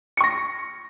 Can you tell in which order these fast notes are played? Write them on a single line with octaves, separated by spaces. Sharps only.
C#7 C#6 A#6